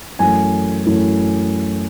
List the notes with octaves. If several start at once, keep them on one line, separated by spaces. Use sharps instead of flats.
F#2 E3 A3 G#5
F#2 E3 A3